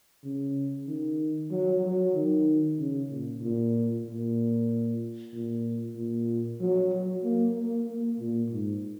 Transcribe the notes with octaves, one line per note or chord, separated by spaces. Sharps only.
C#3
D#3
F#3
F#3
D#3
C#3
A#2
A#2
A#2
A#2
A#2
F#3
F#3
A#3
A#3
A#3
A#2
G#2